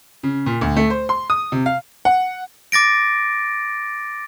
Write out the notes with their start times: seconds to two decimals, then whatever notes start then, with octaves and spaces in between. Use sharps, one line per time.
0.23 C#3
0.46 A#2
0.61 D2
0.76 A3
0.90 C5
1.09 C6
1.30 D#6
1.52 C3
1.66 F5
2.05 F#5
2.72 D6 A6 A#6 D7